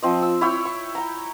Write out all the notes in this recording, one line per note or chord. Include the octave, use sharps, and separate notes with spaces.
F3 C4 D#5
E6
E4 C#5 G5
C#6
G5 A#5